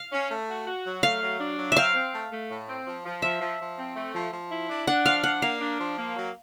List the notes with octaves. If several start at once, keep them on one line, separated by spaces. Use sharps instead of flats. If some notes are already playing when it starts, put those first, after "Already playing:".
Already playing: F5
C#4
A3
F#4
F#4
F#3
A3 F5
F#3
D4
F#3
C4 E5 F5
C4
A3
A3
A2
C4
F3
F3
F3 E5
F3
F3
C4
A3
F3
F3
E4
D4
D4 F#5
F3 F5
D4 F#5
A#3 F5
D4
F3
A#3
F#3